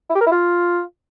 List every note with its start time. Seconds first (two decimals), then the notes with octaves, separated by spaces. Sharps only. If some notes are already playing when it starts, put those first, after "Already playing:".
0.10 E4
0.15 G4
0.21 A#4
0.26 E4
0.32 F4